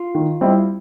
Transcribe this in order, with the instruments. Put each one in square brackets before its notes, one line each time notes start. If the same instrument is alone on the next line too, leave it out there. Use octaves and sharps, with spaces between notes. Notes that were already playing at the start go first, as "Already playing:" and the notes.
Already playing: [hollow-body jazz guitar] F4
[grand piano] D#3
G3 C4 E4